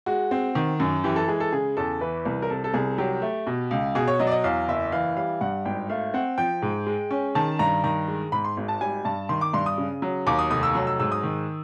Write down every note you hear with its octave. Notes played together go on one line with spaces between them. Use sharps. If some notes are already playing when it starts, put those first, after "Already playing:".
G#3 F#4
C4
D#3
F#2
E3 G4
A4
G#3 G#4
A4
C#3 G#4
E2 A4
E3 B4
C2
A#4
C3 A4
A4
C2 G#4
F#3 G4
A3
B2
C#2
B2 G#4
C#5
F#3 D#5
D5
D#5
E2 F5
F#1 E5
E3 F5
G3 F5
G2 F#5
G#1 G5
A3 F5
C4 F#5
F3 G5
G#2
G#3
C#4
D#3 A5
G2 A#5
D#3 A#5
G#3
G#2 B5
C6
G#1
A5
G3 G#5
G2 A5
D#3 C6
D6
G2 C6
D#6
C#3
F#3
D#2 D6
D#6
F1 D#6
E6
F#3
E6
G#2 E6
D#6
D#3